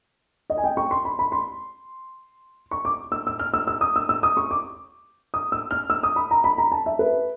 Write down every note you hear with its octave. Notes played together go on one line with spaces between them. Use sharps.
D#5
G#5
G5
C#6
C6
B5
B5
C6
C#6
D6
E6
E6
F6
E6
E6
D#6
E6
E6
D#6
C#6
D6
D#6
E6
F6
E6
D#6
B5
A#5
B5
A#5
A5
E5
B4